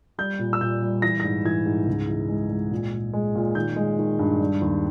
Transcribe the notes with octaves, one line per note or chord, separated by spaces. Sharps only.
G3 G6
A#2
E6
A#2 G6
G3
E3 A#6
G#2 A#6
E3 G#6
G#2
C#2
E3
G#3
G#3
A#2
A#2
G#3
A#2
D#3 G6
G#3
D#3
G2
G3
D#2